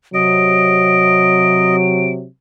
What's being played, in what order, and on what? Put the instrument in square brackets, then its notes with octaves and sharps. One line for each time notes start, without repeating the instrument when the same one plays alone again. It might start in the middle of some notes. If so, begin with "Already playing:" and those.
[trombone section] C3 F#3 [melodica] D#5 [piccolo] D7